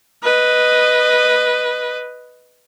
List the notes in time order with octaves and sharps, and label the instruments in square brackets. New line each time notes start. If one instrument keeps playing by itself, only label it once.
[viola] B4 D#5